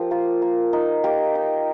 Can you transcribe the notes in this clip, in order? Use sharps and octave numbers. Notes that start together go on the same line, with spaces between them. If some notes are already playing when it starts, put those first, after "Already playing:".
Already playing: F3 G4 A#4
A#3 F4
A#3
D#4
A#3 G4
D#4